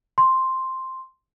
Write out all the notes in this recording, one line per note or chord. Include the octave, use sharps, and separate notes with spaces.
C6